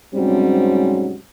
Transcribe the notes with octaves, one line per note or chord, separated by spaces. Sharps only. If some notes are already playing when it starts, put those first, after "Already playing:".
G#2 C3 F#3 G3 C4 C#4